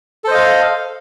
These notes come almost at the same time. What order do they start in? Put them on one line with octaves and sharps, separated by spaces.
A4 C5 D#5 F5